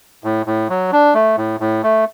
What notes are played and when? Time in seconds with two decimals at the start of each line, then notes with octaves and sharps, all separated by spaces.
0.24 A2
0.46 A2
0.69 F#3
0.92 D4
1.14 A3
1.37 A2
1.60 A2
1.83 A3